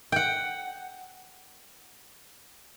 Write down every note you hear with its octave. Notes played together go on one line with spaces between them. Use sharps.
F#5 G5